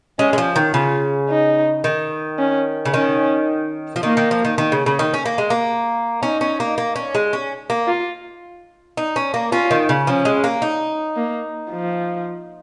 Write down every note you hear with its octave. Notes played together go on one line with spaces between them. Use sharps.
G#3 C#4
G#3
F3
D#3
C#3 F4
D#4
D#3
C#4
C#3
D#3 C#4
F3
D#3 A#3
D#3
F3
D#3
D#3
C#3
C#3
D#3
C#4
A#3
G#3
A#3
C#4 D#4
C#4
A#3
A#3
C#4
G#3
C#4
A#3
F4
D#4
C#4
A#3
C#4 F4
D#3
C#3
F3 C#4
G#3
A#3
D#4
A#3
F3